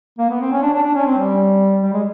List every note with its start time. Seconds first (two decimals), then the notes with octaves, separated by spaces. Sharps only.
0.18 A#3
0.30 B3
0.41 C4
0.52 C#4
0.62 D4
0.73 D4
0.84 D4
0.95 C#4
1.06 C4
1.17 G3
1.82 G3
1.93 G#3